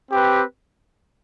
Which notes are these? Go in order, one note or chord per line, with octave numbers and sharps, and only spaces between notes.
C4 G4 B4